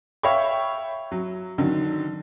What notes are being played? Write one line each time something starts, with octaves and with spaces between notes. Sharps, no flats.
C#5 E5 F5 G5 B5 C#6
F#3
D3 D#3 F#3